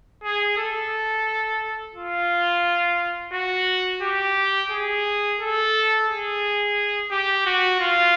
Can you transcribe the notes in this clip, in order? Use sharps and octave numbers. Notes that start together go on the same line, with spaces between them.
G#4
A4
F4
F#4
G4
G#4
A4
G#4
G4
F#4
F4